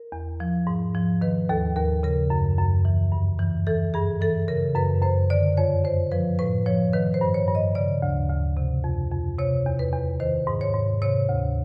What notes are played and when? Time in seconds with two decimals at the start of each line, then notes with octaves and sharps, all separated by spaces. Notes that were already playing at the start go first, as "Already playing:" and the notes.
Already playing: A#4
0.12 E2
0.40 F3
0.67 G#2
0.95 F3
1.21 D#3 B4
1.49 D#2 A4
1.76 D#2 A#4
2.03 C#3 A#4
2.30 F#2
2.58 F#2
2.85 E3
3.12 G2
3.39 E3
3.67 E3 A4
3.94 G2 G#4
4.21 E3 A4
4.48 C#3 A#4
4.75 F#2 B4
5.02 F#2 C5
5.30 D3 D5
5.57 F2 C#5
5.84 F2 C5
6.12 F3 B4
6.39 A2 B4
6.66 F3 C#5
6.93 D#3 B4
7.14 C5
7.21 G2
7.34 C#5
7.48 G2
7.55 D#5
7.75 C#3 D5
8.02 D2
8.30 D2
8.57 C3
8.84 F2
9.11 F2
9.38 C3 C#5
9.66 E2
9.79 B4
9.93 E2
10.20 D#3 C5
10.47 G#2
10.61 C#5
10.74 G#2
11.02 C3 C#5
11.29 D2